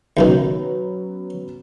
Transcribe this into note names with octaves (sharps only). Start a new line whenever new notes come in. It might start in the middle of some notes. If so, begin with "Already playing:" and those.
D#2 B2 D#3 F#3 B3 C#4